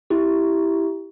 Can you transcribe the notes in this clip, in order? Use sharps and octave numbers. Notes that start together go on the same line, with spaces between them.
E4 G4